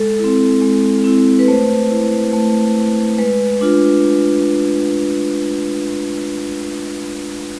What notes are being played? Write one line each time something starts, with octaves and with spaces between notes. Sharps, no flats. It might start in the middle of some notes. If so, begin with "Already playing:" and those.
Already playing: G#3 A4
E4
C4
G#3
C4 E4
B4
A3 C5
E4
A3
E4
G#3 B4
D4 F4